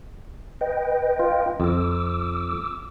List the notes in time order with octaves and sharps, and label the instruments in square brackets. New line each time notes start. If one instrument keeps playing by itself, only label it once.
[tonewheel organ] B4 D#5 G5
[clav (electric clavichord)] F4
[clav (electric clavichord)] F2 [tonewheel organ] D6 E6